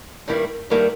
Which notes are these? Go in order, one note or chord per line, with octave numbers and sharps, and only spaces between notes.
G2 D#3 G3 A#3 E4
G2 D#3 G3 A#3 E4